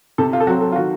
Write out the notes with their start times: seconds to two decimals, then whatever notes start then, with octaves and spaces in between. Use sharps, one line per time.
0.18 C3 A4
0.33 F4
0.40 A4
0.47 F#3 F#4
0.50 C4
0.61 A4
0.72 F4
0.76 D#3 F#4